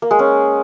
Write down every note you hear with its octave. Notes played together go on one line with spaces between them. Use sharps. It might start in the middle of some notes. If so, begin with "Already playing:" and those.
A#3
G#3
C#4